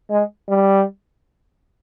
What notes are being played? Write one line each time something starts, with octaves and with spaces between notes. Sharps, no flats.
G#3
G3